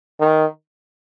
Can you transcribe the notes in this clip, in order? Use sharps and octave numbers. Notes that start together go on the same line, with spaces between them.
D#3